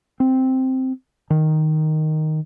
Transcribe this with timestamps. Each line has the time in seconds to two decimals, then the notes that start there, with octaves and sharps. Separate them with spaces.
0.20 C4
1.30 D#3